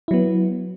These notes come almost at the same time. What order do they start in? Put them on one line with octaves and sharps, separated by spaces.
E4 F#3 B3